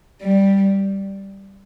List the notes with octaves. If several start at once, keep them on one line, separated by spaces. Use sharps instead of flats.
G3